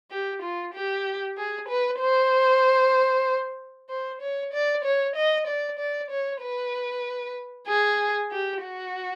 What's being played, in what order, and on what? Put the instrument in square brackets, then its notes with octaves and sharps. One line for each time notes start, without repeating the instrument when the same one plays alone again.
[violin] G4
F4
G4
G#4
B4
C5
C5
C#5
D5
C#5
D#5
D5
D5
C#5
B4
G#4
G4
F#4